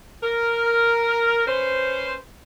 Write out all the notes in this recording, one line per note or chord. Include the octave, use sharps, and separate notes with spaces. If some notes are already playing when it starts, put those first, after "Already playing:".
A#4
C#4 B4 C5